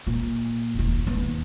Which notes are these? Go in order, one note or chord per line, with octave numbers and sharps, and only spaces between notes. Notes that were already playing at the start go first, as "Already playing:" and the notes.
A#2
E1 D#2
D#2 B3